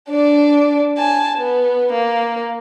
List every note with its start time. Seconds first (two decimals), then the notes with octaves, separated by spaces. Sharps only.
0.10 D4 D5
0.97 G#5 A5
1.38 B3
1.92 A#3